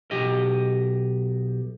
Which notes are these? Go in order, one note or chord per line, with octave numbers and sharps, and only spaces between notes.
B1 G4 D#5